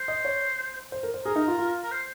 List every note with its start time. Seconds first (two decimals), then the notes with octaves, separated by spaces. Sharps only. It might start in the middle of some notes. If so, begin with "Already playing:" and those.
Already playing: C5
0.08 D#5
0.25 C#5
0.92 C5
1.03 A#4
1.14 C5
1.25 G#4 A#4
1.36 D#4
1.48 F4
1.58 F4
1.84 A#4
1.91 C5